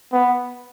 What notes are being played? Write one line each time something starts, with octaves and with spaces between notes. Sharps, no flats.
B3